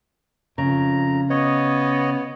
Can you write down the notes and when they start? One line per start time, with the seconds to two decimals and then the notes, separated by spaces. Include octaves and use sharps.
0.58 F2 C#3 A#5
1.30 B3 C#5 D#5